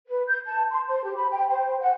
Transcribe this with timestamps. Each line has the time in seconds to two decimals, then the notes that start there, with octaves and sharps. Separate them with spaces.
0.07 B4
0.27 G6
0.46 A5
0.70 C6
0.88 C5
1.04 G4
1.16 B5
1.30 G5
1.49 C5
1.80 F#5